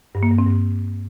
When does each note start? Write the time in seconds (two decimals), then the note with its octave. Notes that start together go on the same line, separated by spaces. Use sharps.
0.15 G2
0.23 A#3
0.31 G2
0.38 C4
0.46 G2